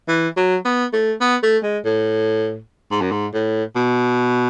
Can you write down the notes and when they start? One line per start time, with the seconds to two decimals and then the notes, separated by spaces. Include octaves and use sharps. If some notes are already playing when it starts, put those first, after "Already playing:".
0.08 E3
0.36 F#3
0.65 B3
0.93 A3
1.21 B3
1.43 A3
1.63 G#3
1.85 A2
2.91 G#2
3.01 F#2
3.11 G#2
3.34 A2
3.75 B2